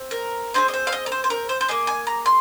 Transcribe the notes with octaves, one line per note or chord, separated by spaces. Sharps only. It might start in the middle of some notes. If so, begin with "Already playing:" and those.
Already playing: C4
A#4
C4 D#4 G#4 C5
D#5
C5
F5
D#5
A#4
C5
C5
A#4
C5
C5
A#3 G#4 D#5
G#5
A#5
C6